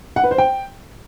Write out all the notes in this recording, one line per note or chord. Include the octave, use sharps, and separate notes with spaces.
F#5
B4
C5
G5